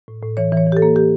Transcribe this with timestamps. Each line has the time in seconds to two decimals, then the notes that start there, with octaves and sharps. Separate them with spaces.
0.08 A2
0.23 A2
0.37 E3 C#5
0.52 E3 C#5
0.67 E3
0.72 G4
0.77 A4
0.82 A#3
0.96 E3 G4